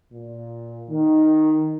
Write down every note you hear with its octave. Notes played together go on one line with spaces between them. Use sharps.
A#2
D#3